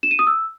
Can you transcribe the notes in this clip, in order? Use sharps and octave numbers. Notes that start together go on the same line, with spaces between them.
E7
D#7
D#6
E6